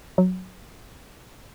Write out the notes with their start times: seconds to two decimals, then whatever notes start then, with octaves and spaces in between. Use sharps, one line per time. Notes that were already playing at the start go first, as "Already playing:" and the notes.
0.18 F#3